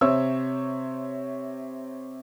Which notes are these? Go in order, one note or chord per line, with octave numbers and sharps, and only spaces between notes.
C3 C5 C#5 E5 E6